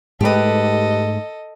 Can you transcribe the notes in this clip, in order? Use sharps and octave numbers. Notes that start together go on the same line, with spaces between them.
G#2 G#3 A3 G4 A4 B4 D#5